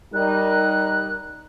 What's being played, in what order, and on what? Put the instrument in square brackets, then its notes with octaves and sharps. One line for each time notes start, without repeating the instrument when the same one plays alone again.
[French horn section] G3 D#4 A#4 [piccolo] F#6